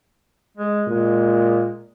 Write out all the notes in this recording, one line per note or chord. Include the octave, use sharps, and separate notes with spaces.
G#3
A#2 G#3